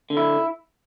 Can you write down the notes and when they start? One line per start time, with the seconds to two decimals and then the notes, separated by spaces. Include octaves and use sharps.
0.10 D3
0.17 E4